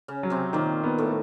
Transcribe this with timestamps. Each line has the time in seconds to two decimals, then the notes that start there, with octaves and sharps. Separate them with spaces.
0.08 C#3 C#4
0.23 F#3
0.30 C3 C4
0.53 A#2 D#3 A#3
0.84 B3
0.98 A2 A3